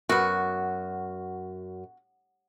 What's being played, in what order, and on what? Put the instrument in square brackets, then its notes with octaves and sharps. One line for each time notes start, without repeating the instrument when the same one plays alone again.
[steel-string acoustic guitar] F#2 [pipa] B3 F#4